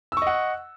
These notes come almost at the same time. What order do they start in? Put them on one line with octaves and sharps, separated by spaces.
E6 C#6 D#5 F#5